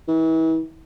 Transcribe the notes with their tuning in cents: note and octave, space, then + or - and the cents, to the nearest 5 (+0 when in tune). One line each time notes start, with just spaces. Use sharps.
E3 -35